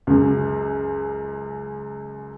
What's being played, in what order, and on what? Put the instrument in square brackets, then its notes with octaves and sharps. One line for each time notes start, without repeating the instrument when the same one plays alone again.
[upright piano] C#2 F#2